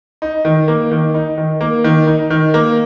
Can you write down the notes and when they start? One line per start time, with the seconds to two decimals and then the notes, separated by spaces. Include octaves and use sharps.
0.22 D#4
0.45 D#3
0.68 A#3
0.91 D#3
1.14 D#4
1.38 D#3
1.61 A#3
1.84 D#3
2.07 D#4
2.30 D#3
2.54 A#3